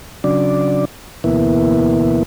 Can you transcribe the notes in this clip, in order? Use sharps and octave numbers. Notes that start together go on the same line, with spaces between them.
C#3 F#3 D4 D5
D2 B2 E3 A#3 B3 E4